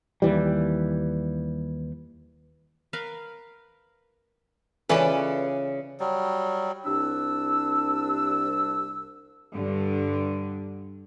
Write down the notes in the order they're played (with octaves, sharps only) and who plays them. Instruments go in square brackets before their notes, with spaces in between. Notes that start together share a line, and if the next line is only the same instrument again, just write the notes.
[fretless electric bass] D#2 E3 G3
[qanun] A#4 B4 F5
[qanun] C#3 F4 [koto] E3 C#4 [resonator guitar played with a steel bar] A4 B4 D5
[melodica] F#3 G3
[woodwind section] C2 D4 E6
[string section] G2 D3